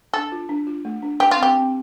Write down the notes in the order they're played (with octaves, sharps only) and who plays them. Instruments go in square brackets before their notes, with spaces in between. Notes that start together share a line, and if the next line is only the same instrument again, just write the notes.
[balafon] D4 [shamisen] A4
[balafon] F4
D4
F4
A3
D4
[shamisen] G4 [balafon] B4
[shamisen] F4
[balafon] C4 [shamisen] G4
[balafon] C4